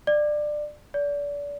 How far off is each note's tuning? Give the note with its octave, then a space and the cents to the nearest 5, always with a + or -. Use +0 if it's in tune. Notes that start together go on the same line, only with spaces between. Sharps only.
D5 +20
D5 -30